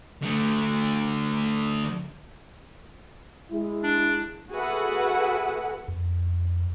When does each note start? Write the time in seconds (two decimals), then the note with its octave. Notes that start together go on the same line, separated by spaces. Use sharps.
0.22 D3 A3
3.51 G#3 E4
3.83 D4
4.52 F#4 G#4 A4 B4 E5 F#5
5.88 F2